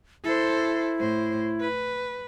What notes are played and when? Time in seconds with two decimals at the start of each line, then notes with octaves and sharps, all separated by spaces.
0.24 E4 A4 C5
1.00 A2 C5
1.60 B4